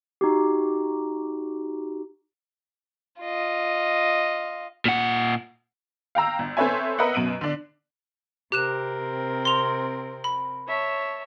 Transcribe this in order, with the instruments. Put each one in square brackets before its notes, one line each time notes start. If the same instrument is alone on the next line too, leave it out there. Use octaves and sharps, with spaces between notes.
[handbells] D#4 F#4 G4
[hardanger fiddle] F4 D#5
[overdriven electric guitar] A#2 F#5
[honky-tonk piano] F5 G5 A#5 E6
G1
C4 A4 B4 C#5 E5 G#5
A#4 B4 D#5 E5 F#5
F#2 B2 D7 D#7 F#7
D3 D4
[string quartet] C3 C4 A#4 [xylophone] G4 F#6 E7
[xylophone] C6 F7
B5
[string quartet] C#5 E5 A5